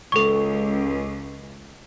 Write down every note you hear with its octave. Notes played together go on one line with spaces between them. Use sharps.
C#2 A4 C#6